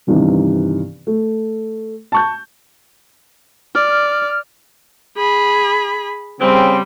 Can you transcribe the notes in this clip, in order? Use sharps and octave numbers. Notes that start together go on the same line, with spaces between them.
G1 G2 C3 D#3 E3
A3
A5 C#6 G6
D5 F6
G#4 B5
C#3 G3 C4